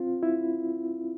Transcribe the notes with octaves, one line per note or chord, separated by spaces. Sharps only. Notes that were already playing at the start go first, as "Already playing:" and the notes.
Already playing: C4 F4
E4